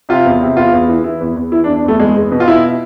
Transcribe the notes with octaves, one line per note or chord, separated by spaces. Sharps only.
C3 F4
E2
C3
E2 F4
E2
E3
E3 E4
E2
E2
E3 E4
D4
E2
D4
E2 A3
E2 G#3
E2
B2
F4
B2 E4